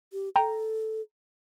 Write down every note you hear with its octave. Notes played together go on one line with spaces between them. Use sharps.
G4
A4 G5 A#5